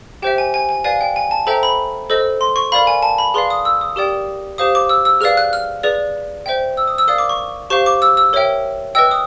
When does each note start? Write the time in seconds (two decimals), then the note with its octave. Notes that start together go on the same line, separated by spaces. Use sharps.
0.22 G4 C5 E5 G5
0.38 G#5
0.54 G#5
0.69 G#5
0.84 B4 D5 F5 G#5
1.01 G5
1.16 G#5
1.31 A5
1.47 A4 C5 E5 G5 A#5
1.63 B5
2.10 A4 C5 D#5
2.41 C6
2.56 C#6
2.72 A#4 D5 F5 B5
2.87 G#5
3.03 A5
3.18 B5
3.34 G#4 B4 D5 F5 C6
3.50 D#6
3.65 E6
3.81 D#6
3.96 G4 A#4 D5 G5 D#6
4.58 G4 C5 F5 D#6
4.75 D6
4.89 E6
5.05 E6
5.21 G#4 B4 D5 F5 F6
5.37 F#6
5.53 F6
5.83 G#4 B4 D5
6.46 C5 E5 G5
6.77 E6
6.88 D#6
6.98 E6
7.08 A#4 D5 F5 D#6
7.18 D6
7.29 C#6
7.70 G4 C5 F5 C#6
7.86 D6
8.02 E6
8.17 E6
8.33 A#4 C#5 E5 G5
8.95 B4 D#5 G5 E6
9.11 D#6